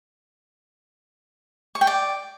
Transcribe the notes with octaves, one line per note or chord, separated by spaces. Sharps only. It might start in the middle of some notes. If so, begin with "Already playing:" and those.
C#6
G5
D5